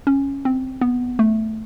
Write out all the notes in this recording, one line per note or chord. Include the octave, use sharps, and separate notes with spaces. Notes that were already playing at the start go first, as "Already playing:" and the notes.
C#4
C4
B3
A3